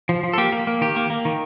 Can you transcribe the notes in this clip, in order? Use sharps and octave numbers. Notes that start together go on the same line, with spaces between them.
F3
F3
A4
A#3 G4
A#3
A#3
D#3 G4
A#3
A#3
D#3